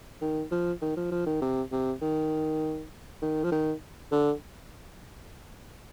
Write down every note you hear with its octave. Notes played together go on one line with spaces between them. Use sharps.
D#3
F3
D#3
F3
F3
D#3
C3
C3
D#3
D#3
F3
D#3
D3